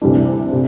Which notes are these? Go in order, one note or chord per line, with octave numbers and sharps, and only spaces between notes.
D2 C3 E3 G3 D4
C3